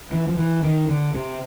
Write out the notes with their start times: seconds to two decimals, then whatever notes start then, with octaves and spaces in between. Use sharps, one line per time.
0.11 E3
0.27 F3
0.37 E3
0.63 D#3
0.88 D3
1.14 C3